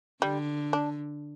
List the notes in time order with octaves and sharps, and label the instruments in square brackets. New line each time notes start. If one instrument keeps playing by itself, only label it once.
[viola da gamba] D3 [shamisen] G3
[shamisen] D4